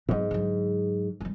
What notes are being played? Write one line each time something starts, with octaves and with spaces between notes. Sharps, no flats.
G#2 F#3 B3
D3 F#3
E3 G3